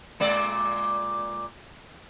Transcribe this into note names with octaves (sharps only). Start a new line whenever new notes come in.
A#2 G#3 D5